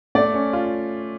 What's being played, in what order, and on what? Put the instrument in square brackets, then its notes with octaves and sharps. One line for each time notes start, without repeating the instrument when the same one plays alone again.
[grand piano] A3 [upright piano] D5
[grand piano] C#4
F4